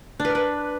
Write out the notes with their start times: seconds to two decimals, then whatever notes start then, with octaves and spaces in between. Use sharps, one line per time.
0.20 D4
0.25 B4
0.30 A#4
0.35 B4